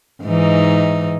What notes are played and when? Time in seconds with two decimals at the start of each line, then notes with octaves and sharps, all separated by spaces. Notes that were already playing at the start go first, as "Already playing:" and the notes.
0.24 G#2 E3 D#4